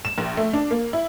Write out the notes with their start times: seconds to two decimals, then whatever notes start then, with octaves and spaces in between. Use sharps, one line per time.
0.05 E7
0.18 A#1
0.37 A3
0.53 D4
0.71 A#3
0.93 E4